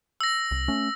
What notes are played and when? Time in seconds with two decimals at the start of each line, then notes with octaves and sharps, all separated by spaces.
0.21 E6 A#6
0.51 C2
0.68 A3 C#4